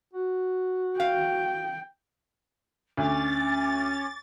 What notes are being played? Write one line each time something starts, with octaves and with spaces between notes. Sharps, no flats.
F#4
F5 G5
D2 C#4 D6 A6